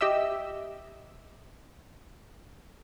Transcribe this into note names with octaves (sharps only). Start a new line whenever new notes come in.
G4 D#5 E5 E6